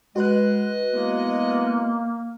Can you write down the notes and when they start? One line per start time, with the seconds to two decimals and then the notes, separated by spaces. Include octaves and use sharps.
0.16 G#3 F#4 B4 D#5 F#6
0.93 E3 G#3 A#3 B3